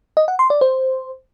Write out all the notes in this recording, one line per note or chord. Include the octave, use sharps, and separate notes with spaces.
D#5
F#5
C6
D5
C5